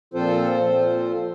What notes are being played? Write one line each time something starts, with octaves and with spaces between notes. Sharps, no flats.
A#2 F3 C4 F4 A4 C5
A#2 F3 C4 F4